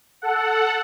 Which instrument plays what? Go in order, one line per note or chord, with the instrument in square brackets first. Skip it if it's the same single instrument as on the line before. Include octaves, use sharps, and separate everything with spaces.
[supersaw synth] A4 F#5